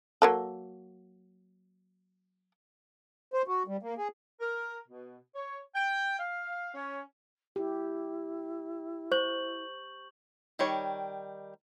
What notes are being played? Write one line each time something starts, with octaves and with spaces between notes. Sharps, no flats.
F#3 A#3 A4
C5
F#4
G3
A#3
G#4
A#4
B2
C#5
G5
F5
C#4
E4 G4
C5 C#6 G6 F#7
D#3 G3 C#5